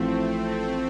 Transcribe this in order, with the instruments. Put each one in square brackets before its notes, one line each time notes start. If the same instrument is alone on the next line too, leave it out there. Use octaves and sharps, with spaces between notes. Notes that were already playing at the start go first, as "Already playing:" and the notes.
Already playing: [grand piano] A1 A2 F3 [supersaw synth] A3 C4